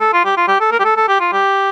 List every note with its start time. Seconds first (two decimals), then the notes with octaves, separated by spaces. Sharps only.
0.01 A4
0.13 F4
0.25 G4
0.37 F4
0.48 G4
0.60 A4
0.72 A#4
0.80 G4
0.85 A4
0.97 A4
1.08 G4
1.20 F4
1.32 G4